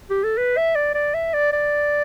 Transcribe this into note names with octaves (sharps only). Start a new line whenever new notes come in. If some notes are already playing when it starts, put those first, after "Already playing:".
G4
A4
B4
E5
D5
D5
E5
D5
D5